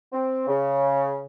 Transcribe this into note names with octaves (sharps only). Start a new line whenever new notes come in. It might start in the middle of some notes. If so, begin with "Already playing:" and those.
C4
C#3